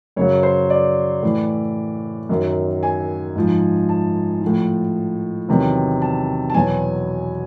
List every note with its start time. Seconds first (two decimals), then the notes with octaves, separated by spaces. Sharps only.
0.16 F#2 C#3 F#3 C#5
0.43 C5
0.70 D5
1.23 A2 E3
2.29 F#2 D#3 F#3
2.83 G#5
3.36 G#2 F3
3.89 A5
4.42 A2 F3
5.49 E2 C3 D#3 F#3
6.02 A5
6.50 A5
6.54 E2 B2 F#3 G#5